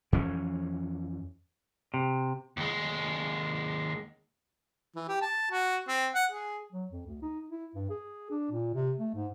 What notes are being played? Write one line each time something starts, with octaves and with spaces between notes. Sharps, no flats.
F2 E3 C#4
C3
D#2 G#3
E3
G4
A5
F#4
C4
F#5
G#4
F#3
F2
D2
D#4
E4
G2
G#4
D4
A#2
C3
A3
G#2